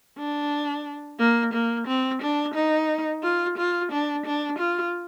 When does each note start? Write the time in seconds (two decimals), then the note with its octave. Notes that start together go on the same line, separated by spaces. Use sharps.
0.18 D4
1.19 A#3
1.53 A#3
1.88 C4
2.22 D4
2.55 D#4
3.23 F4
3.58 F4
3.92 D4
4.26 D4
4.59 F4